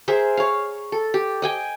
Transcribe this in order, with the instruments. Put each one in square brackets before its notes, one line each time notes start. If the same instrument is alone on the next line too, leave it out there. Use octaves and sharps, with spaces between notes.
[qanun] G#4 A#4 C5 E5
C#5 F5
A4
G4
D#5 G5 G#5